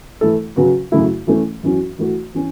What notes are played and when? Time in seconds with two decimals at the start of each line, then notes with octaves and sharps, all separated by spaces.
0.21 E3 A3 E4 A4
0.56 C#3 F#3 C#4 F#4 B4
0.92 F#2 C#3 A3 E4
1.27 E3 A3 C#4 A4
1.63 F#2 E3 C#4 F#4
1.98 E3 A3 F#4
2.34 E3 C#4